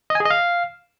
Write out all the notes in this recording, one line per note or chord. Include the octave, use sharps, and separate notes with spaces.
D#5
G#5
G#4
D#5
F5